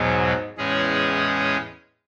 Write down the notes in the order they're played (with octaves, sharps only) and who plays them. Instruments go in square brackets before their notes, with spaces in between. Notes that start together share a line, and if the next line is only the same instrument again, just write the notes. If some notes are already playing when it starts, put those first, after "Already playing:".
Already playing: [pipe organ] E2 B2 F#3 B3 [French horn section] G#2
[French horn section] E2 [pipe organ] A2 G#3 C#4 G#4 C#5